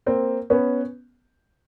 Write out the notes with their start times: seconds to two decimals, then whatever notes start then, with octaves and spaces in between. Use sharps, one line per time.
0.06 A#3 C4
0.50 B3 C#4